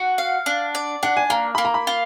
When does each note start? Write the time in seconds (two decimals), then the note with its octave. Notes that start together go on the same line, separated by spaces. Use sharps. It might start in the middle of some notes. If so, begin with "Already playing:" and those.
Already playing: F#4 F#5
0.18 F5
0.46 D4
0.75 D5
1.03 D4 F#5
1.17 G#5
1.30 A#3 A#5
1.55 A#3 B5
1.65 A#5
1.74 B5
1.87 F4